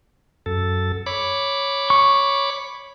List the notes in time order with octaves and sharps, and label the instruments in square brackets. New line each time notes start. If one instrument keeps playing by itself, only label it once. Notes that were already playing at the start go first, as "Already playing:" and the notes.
[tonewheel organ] F#2 A4
C#5 B5 D6
[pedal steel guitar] C#6